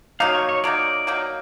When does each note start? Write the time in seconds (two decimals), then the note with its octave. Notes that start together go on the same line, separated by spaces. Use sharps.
0.20 F#3 A#3 D#4 F5
0.34 C#5
0.49 C#5
0.64 F#3 A#3 D#4 D5
1.07 F#3 A#3 D#4